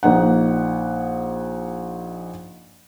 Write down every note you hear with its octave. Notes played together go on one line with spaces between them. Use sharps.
A#1 D#4 F#5